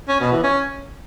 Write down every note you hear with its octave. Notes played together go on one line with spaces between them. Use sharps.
C#4
B2
E3
C#4